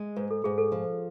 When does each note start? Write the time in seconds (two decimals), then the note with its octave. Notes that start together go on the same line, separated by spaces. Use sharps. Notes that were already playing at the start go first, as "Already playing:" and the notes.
Already playing: G#3
0.16 G#2 B4
0.31 A4
0.44 G#2 G#4
0.58 A4
0.72 F3